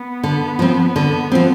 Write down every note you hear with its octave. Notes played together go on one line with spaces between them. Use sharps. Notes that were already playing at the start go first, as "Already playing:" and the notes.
Already playing: B3
D3
F3 C4
D3
F3 C4